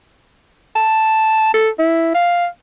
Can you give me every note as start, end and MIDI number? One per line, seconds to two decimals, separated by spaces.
0.76 1.52 81
1.54 1.69 69
1.79 2.14 64
2.15 2.47 77